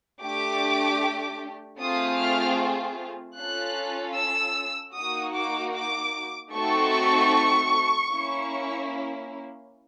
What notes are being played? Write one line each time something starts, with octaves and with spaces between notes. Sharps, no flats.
A3 D4 G4 D6
A3 C4 F4 G#4 D#6
F6
C#4 F4 A4 F#6
E6
A#3 D#4 F#4 D#6
D6
D6
A3 C4 D#4 F#4 A4 C#6
A#3 C#4 E4